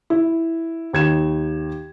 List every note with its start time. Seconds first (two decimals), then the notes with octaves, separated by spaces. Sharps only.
0.10 E4
0.93 D#2 G#6 E7